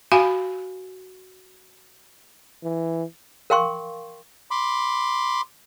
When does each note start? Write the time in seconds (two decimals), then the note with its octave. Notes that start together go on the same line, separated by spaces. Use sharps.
0.12 F#4 F5 G#5 B5
2.63 E3
3.50 A#4 F5 G5 C6 C#6
4.51 B5 C6 D6